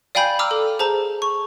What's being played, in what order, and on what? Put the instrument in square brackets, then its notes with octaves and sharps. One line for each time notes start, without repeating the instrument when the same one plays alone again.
[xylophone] D5 F5 G5 G#5 B5 G6
A#5 D6 E6 F6
A4
G#4 C5 A5 A#5
C#6